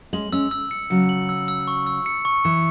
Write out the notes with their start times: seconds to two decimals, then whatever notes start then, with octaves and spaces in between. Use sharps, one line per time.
0.13 G#3 C#4 F#7
0.32 G#3 C#4 E6
0.51 E6
0.71 C#7
0.90 C#3 F#3 C#7
1.09 F#7
1.29 E6
1.48 E6
1.67 C#6
1.87 E6
2.06 C#7
2.25 C#6
2.45 E3 C#7